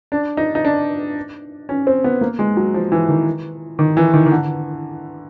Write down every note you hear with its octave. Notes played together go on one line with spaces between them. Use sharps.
D4
D#4
D#4
D4
C#4
C4
B3
A#3
G#3
F#3
F3
E3
D#3
D#3
E3
D#3
D#3
D3